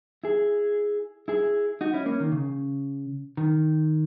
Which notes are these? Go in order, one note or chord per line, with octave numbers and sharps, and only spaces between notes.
E4 G#4
E4 G#4
D#4 F#4
C#4 E4
A#3 C#4
D#3
C#3
D#3